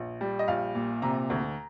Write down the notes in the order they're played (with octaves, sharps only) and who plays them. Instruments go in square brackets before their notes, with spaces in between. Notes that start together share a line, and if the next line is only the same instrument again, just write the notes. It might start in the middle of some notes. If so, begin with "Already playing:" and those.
Already playing: [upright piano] A#1
G3
D#5
A#1 F5
A#2
C3 A#5
D2